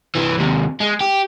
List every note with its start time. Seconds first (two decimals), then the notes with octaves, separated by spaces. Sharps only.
0.15 C2 E3
0.38 D#2 C3
0.81 G#3
1.01 G4